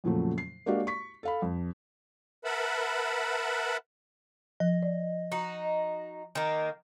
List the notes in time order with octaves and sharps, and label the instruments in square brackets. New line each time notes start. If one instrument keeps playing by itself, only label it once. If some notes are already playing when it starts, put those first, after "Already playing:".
[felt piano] F2 A#2 C#3 F3 F#3 A3
C7
G#3 A#3 D4 F#4 G4 F5
C#6 B6
A4 F5 B5
F2
[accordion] A#4 B4 E5 F#5 A5 B5
[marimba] F3 [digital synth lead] D#5
[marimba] D5
[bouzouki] D#4 F#4
D#3 A#3